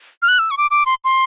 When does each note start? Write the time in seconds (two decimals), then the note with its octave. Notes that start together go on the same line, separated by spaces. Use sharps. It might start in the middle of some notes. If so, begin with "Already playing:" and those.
0.22 F6
0.28 F#6
0.39 E6
0.51 C#6
0.58 D6
0.71 D6
0.86 C6
1.04 C6